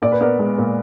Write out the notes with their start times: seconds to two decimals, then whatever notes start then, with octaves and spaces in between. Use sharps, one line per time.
0.02 A#2 D5
0.12 B4
0.21 B3 A#4 D5
0.39 G#3
0.58 A#2